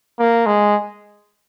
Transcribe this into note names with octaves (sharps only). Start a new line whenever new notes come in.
A#3
G#3